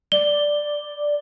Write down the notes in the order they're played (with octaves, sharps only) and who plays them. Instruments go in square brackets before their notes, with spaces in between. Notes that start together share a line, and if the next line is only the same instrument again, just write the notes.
[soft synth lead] D5 [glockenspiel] G7